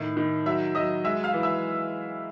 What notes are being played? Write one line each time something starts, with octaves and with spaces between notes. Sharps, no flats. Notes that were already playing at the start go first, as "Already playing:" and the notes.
Already playing: A2 D#3 E5
D#3
F#3 E5 E6
F#3 D#5 D#6
G#3 E5 E6
F5 F6
E3
E5 E6